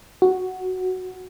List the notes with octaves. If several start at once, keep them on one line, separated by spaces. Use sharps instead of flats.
F#4